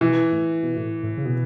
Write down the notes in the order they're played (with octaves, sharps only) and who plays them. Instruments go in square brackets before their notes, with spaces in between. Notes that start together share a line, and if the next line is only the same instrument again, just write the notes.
[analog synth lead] B2 [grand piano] E3
[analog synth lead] A2
B2
A2
A2
C#3
B2